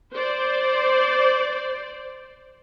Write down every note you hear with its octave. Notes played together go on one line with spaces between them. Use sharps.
C5 D5